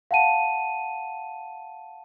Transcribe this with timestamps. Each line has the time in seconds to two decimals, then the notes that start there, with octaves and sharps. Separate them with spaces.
0.11 F5 F#5 A5 D#7